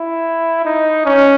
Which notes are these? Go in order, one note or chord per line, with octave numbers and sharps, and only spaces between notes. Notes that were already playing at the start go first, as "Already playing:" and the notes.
Already playing: E4
D#4
C#4